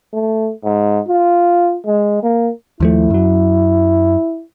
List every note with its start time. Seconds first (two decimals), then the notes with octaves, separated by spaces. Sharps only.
0.14 A3
0.64 G#2
1.09 F4
1.86 G#3
2.23 A#3
2.80 D#2 F3 A3 E4
3.10 F#2 F#3